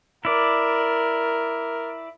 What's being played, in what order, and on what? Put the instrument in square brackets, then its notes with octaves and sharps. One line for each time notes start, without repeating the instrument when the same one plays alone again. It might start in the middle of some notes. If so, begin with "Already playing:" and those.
[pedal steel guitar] E4 D5 [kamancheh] A#4